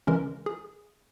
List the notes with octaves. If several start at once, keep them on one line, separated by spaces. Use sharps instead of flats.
C#3 E3 G#3 C#4 A#4
G#4